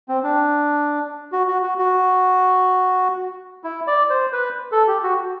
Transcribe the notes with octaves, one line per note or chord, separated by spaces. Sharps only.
C4
D4
F#4
F#4
F#4
F#4
E4
D5
C5
B4
A4
G4
F#4